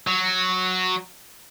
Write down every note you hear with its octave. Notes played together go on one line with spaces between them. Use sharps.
F#3